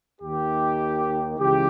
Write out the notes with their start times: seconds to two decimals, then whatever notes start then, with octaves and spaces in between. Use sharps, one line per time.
0.21 D#2 D#3 G4
1.38 C#2 C#3 E3 G4